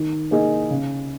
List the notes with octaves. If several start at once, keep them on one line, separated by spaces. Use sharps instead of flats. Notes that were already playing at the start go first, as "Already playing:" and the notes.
Already playing: D#3
A#3 D#4 G#4
C#3